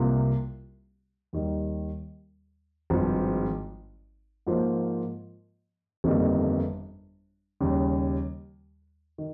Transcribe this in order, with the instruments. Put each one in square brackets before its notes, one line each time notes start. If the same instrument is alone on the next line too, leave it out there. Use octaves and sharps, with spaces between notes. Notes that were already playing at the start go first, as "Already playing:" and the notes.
Already playing: [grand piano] C2 C3 G3 A#3 F4
D#2 D#3 G3
G#1 G2 F3 G#3
G#2 F3 A#3 F4 C5
G1 F2 D#3 G3 A#3
D#2 C#3 G3
D#3